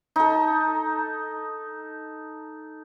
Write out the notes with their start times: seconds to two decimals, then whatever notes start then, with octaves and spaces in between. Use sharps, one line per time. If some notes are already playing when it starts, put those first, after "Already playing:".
0.16 D#4 A4